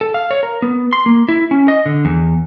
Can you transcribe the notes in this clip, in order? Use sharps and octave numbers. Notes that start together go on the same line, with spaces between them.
A4
F5
C#5
A#4
B3
C6
A#3
E4
C#4
D#5
D3
E2